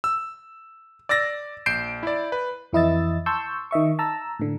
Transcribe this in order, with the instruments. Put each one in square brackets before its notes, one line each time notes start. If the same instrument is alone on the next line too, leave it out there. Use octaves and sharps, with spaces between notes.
[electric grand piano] E6
D5 E6 A6 A#6
A#1 G6 C7 D7 E7
E4 D5
B4
[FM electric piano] F2 E3 E4 D#5 E6 A6
A5 C6 C#6 E6 G6
D#3 D#5 E5 C#6
A5 A#5 E6
A2 D3